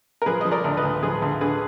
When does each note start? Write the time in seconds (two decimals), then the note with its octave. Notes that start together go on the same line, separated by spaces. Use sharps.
0.22 A#4
0.26 F3 G#4 B4
0.41 F3 D#5
0.52 A#4 D5
0.64 D2
0.77 B4 D#5
0.83 D2
1.03 F3 G#4 B4
1.22 D2
1.41 D3 G#4 B4